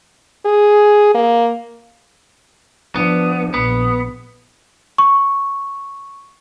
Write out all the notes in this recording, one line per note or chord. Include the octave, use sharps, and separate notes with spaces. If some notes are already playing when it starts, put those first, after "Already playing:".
G#4
A#3
F3 B3 D4
A#1 B3
C#6